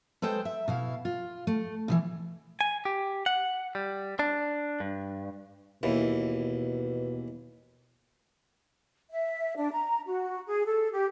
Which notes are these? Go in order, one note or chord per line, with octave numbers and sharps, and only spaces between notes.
G#3 A4 B4 C5 G5
E5
B2 E4 F5
F4
A3
B2 D#3 E3
G#5
G4
F#5
G3
D4
G2
D#2 B2 E3
E5
D4
A#5
F#4
G#4
A4
G4